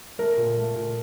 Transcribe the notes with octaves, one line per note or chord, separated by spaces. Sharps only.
A3 A#4
A#2
A3
A#2